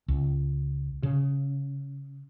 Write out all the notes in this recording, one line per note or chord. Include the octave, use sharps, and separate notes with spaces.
C#2
C#3